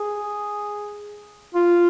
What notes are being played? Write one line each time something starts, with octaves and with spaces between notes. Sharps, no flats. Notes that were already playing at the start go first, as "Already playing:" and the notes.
Already playing: G#4
F4